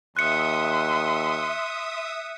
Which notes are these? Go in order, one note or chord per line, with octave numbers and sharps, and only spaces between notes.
D#2 E5 C6 D#6 F#6 C#7